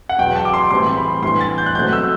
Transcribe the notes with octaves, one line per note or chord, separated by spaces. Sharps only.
F#5
E2 B2 F#3 G5
A5
D6
C6
A2 E3 G3 C4 C6
B5
A2 E3 G3 D4 C6
A6
G6
F#6
B2 F#3 A3 C4 G6
E6